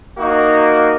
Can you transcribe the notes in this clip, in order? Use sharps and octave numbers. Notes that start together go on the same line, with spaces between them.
A#3 D#4 F#4